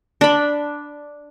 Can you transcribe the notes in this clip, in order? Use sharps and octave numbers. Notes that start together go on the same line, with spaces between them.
D4 B5